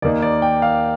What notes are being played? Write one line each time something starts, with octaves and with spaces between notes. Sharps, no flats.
D#2 D#3 A#3 D#4 D5
D5
G5
F5